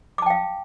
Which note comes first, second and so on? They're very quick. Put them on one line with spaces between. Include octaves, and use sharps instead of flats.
D6 A5 G5 F5